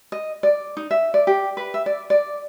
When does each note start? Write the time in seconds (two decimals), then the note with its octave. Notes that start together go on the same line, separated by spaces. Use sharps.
0.12 D#5
0.43 D5
0.77 D#4
0.91 E5
1.14 D5
1.27 G4
1.57 B4
1.74 E5
1.86 D5
2.10 D5